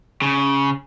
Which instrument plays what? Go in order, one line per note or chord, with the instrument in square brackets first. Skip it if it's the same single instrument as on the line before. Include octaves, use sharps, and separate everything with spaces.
[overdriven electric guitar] C#3